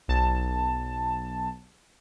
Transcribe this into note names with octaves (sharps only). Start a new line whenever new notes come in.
B1 A5